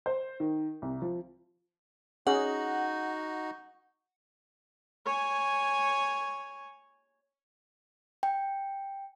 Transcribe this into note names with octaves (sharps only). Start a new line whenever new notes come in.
C5
D#3
C2
F3
C#4 D#4 F#4 G#4 D#5 F#5
C#5 G#5
G5